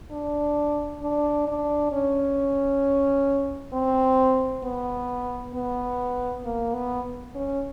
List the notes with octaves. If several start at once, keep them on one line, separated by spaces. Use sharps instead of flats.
D4
D4
D4
C#4
C4
B3
B3
A#3
B3
C#4